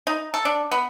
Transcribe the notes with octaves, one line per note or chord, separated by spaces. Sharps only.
D#4
A4
D4
B3